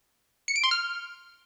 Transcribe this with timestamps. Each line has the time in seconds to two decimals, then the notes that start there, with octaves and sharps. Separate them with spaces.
0.48 C#7
0.56 D7
0.64 C6
0.71 F6